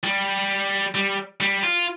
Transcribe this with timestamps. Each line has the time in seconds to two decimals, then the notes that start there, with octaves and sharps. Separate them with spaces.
0.04 G3
0.95 G3
1.40 G3
1.63 F4